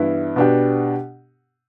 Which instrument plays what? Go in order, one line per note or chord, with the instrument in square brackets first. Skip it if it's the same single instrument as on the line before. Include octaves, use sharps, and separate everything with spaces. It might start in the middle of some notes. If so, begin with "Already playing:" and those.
Already playing: [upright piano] G2 E3 B3 E4
B2 B3 D4 G4